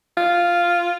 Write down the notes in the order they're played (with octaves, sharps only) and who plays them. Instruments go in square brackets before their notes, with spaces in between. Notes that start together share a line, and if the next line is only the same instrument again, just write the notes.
[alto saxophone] F4